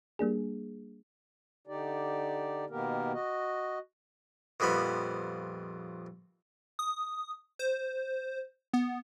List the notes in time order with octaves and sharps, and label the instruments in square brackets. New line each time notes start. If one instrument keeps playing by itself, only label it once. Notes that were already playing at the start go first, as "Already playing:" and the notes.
[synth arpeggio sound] G3 A#3 D4 G#4
[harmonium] D3 D#4 G4 D5
B2 D#3 A#3 B3 G4 A#4
F#4 D#5
[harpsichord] A#1 F2 G3 B3 B5
[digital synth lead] D#6
C5
B3